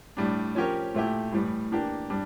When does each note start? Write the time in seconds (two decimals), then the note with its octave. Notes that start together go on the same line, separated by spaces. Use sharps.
0.17 A2 G3 D4
0.55 F3 C#4 G4 A#4 C#5
0.94 A#2 A3 E4 G4
1.33 A2 E3 G3
1.72 E3 A#3 D4 G4
2.10 G3 D4